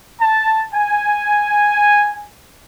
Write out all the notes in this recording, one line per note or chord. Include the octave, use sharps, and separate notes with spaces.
A5
G#5